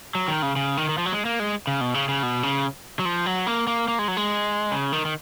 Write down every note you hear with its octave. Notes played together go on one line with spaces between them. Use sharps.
F#3
D#3
C#3
C#3
D#3
D#3
F3
F#3
G#3
A#3
G#3
C#3
B2
C#3
C#3
B2
C#3
F#3
F3
F#3
A#3
A#3
A#3
G#3
F#3
G#3
C#3
D#3
D#3